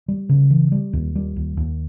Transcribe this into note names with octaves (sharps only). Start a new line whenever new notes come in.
G3
C#3
E3
G3
D#2
G3
D#2
D#2